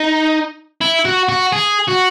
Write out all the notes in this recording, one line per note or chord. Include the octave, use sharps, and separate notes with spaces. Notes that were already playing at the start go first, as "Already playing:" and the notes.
Already playing: D#4
E4
F#4
F#4
G#4
F#4